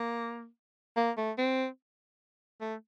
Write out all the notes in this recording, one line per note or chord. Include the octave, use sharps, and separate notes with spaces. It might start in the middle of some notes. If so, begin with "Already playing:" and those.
Already playing: A#3
A#3
A3
C4
A3